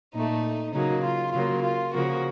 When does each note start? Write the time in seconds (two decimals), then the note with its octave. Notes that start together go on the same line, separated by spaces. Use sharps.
0.14 A#2 A3 D#4
0.73 C#3 F#3 A#3 D#4
1.04 F4
1.33 C#3 F#3 A#3 F4
1.62 F4
1.93 C#3 F3 A#3 F#4